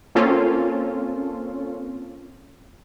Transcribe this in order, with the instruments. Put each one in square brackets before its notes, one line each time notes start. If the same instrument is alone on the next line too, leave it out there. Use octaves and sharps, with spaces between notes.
[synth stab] A#3 C4 C#4 F4 A4